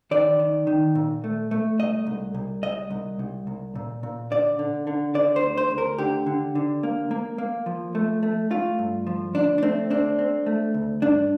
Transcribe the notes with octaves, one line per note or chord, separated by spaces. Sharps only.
D#3 D5
D#3
D#3
A#2
A3
A3
C2 D#5
C2
C2
C2 D#5
C2
C2
C2
A#2
A#2
D3 D5
D3
D3
D3 D5
C5
D2
C5
D2
A#4
D3 G4
D3
D3
A#3
A#3
A#3
F3
A3
A3
A3 F4
G2
F3
D2 D4
D4
A3 C4
C4 D4
C4
A3
D2
G2 D4